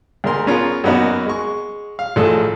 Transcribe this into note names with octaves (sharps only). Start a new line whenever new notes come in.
D2 G#3 A#4 C6
B3 C#4 F4 G#4 A#4
F#2 A#3 B3 C#4 D#4 F#4
G#3 C#6
F5
A1 F3 G#3 A4 D#5 D#6